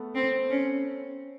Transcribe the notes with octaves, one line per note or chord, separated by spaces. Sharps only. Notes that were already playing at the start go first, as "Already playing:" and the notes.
Already playing: A3 B3
C4
C#4